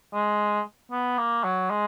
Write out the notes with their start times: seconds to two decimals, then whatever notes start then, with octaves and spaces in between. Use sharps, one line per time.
0.13 G#3
0.91 B3
1.18 A#3
1.44 F#3
1.70 G#3